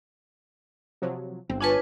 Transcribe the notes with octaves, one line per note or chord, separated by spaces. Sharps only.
C3 F3 F#3
G1 C4
D4 F4 B4 C#5 G#5 A5